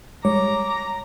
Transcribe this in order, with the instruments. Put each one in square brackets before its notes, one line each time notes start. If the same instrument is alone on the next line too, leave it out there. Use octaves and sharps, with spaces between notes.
[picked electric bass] G3 G#3 [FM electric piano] C#5 [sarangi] A#5 [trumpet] D6